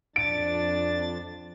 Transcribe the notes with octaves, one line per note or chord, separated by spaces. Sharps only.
F2 D4 A6 D7